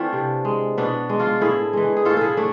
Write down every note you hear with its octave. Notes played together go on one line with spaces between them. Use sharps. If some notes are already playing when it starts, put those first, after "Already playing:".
Already playing: E3 A3 C4 D4 F4
C3
G#3
B2 B3 D4
G#3
D4 F4
A2 E4 G#4
E3 G#3
G#4
A2 F4 A4
E4 G#4 A4
A3 D4